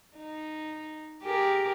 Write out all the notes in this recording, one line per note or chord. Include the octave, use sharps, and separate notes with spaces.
D#4
G4 G#4 A#4